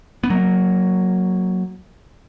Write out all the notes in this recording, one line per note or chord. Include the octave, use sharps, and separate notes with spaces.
B3
F#3 A#3